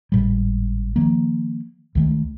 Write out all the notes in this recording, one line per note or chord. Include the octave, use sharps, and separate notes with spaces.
G#1 A2 G3
D#3 F3 A#3
C#2 D#3 A3